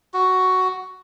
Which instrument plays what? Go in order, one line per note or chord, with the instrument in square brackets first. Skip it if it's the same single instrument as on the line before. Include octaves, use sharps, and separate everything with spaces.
[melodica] F#4